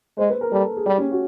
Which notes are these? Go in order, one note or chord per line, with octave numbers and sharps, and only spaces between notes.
G#3 C5
B4
A#4
G3 A4
G#4
G3 G4
C#4
F#4